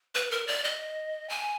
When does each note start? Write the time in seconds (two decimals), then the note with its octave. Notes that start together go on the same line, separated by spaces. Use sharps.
0.15 B4
0.31 A#4
0.47 D5
0.64 D#5
1.30 G#5